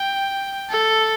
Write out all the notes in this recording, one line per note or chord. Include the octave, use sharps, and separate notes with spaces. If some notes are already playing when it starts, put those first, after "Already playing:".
Already playing: G5
A4